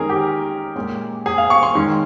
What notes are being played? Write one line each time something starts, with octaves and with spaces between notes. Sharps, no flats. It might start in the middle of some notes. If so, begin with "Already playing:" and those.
Already playing: D#3 G#3 C#4 G#4 A#4
G4
A#2 G#3 C#4
G#4
F5
C#6
C6
D#3 G#3 C#4